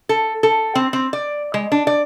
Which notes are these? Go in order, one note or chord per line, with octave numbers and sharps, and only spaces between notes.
A4
A4
C4
C4
D5
G#3
D4
D5